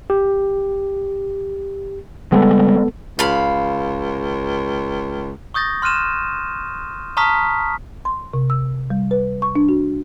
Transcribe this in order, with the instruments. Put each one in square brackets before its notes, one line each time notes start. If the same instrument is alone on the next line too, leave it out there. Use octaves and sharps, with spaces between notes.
[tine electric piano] G4
[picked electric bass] C#3 G3 G#3 [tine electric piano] B3 A4
[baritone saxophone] C#2 [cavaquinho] F5 B5
[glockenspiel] C#6 D#6 G6 A6 A#6
C6 F6 F#6 D#7 E7
A5 A#5 C#6 D#6 F6 B6
[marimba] C6
C3
E6
G3
B4
C#6
D4
F#4